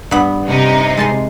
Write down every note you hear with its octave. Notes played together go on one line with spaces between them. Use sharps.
G2 B3
C3 D#4
G#3 A5 C6